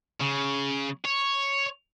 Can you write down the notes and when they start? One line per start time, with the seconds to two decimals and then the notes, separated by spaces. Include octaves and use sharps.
0.21 C#3
1.05 C#5